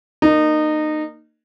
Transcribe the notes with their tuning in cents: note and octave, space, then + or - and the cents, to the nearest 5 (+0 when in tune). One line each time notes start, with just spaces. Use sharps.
A#3 -15 D#4 -25